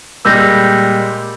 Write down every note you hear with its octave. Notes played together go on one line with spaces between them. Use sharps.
A#2 G3 G#3 E6 G6 A#6